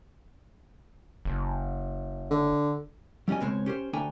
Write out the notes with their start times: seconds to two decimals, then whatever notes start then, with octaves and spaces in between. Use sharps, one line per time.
1.25 F#1
2.31 D3
3.28 F#3 G3 C#4 D#5 G#5
3.40 C#2 B2 G#3 C4 C5 C#5
3.66 C#4 G4 A#4 C5
3.93 D2 A3 D4 G5 G#5 A#5